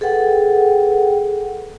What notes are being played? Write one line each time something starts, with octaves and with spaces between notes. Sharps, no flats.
G#4 A4 B4 F#5 G5